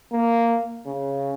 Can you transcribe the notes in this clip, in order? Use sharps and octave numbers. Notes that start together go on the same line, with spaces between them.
A#3
C#3